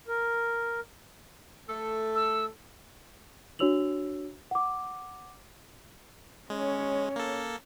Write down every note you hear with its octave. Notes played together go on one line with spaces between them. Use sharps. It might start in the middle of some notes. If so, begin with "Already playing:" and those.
A#4
A3 A4
E6
D4 F#4 C#5 E6 F7 F#7
F#5 D6
G#3 C#4 C#5
A#3 A4